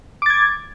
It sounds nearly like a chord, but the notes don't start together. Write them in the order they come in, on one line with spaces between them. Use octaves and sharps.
D6 A6 G#6